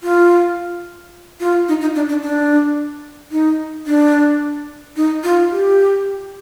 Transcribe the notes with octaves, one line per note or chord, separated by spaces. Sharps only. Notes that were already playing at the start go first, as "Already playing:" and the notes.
F4
F4
D#4
D#4
D4
D4
D4
D#4
D4
D#4
F4
G4